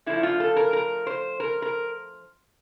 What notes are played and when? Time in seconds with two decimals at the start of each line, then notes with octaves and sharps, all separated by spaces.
0.06 D3 F3 A3 E4
0.23 F4
0.40 A4
0.56 A#4
0.73 A#4
1.07 C5
1.40 A#4
1.62 A#4